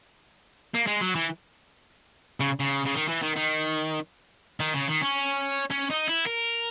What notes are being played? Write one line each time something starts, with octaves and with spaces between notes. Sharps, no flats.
A#3
G#3
F#3
E3
C#3
C#3
C#3
D#3
E3
D#3
D#3
D#3
C#3
D#3
C#4
C#4
D#4
E4
A#4